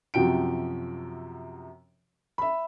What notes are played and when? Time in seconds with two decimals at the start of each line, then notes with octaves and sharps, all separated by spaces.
0.14 F#2 C3 F3 F#4 G5 D7
2.38 E5 B5